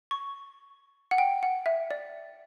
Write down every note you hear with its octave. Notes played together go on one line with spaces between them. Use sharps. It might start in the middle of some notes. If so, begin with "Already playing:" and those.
C#6
F#5
G5
F#5
E5
D5